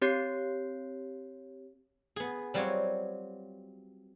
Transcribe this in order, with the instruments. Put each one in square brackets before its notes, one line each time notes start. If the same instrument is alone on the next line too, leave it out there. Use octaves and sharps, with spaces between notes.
[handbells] C4 G4 C#5 G6 C7
[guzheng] B3 G#4
F#3 G3 C4 F4 G4 C#5